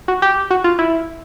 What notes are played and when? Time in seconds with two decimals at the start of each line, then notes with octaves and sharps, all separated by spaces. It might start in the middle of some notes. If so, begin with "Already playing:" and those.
0.08 F#4
0.22 G4
0.51 F#4
0.64 F4
0.79 E4